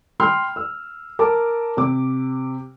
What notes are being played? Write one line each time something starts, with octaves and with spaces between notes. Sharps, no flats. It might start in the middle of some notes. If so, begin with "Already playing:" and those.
G5 B5 C6 F6
E6
A#4 A5 D6
C3 D6